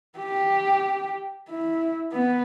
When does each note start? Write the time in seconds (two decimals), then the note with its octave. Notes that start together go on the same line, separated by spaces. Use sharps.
0.19 G4
1.49 E4
2.13 B3